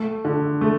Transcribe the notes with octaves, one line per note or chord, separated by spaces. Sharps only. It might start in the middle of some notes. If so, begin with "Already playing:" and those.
Already playing: A3
D3
A3